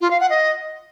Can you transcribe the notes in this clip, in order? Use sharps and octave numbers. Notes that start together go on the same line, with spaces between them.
F4
F5
F#5
D#5